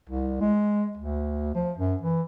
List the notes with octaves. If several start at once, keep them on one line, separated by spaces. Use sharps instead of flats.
C2
G#3
D2
F3
F#2
E3